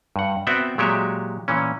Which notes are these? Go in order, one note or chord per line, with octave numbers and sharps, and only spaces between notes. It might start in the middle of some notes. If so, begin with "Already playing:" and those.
G2 F#5
B3 C4 F#4 D5 E5 G5
A#2 F#3 G#3 G4 C#5 E5
A#2 E3 C#4